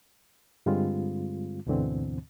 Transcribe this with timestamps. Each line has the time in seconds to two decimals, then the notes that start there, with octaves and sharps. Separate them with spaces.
0.66 G2 D3 G3 G#3 C4 F4
1.67 D2 G#2 B2 D3 E3 C4